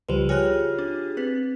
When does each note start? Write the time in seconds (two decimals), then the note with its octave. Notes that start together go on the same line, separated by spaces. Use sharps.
0.09 C#2 F3 G3 B4 C5
0.29 F4 G4 G#4 C#5 F6 F#6
0.79 D4
1.17 C4 B4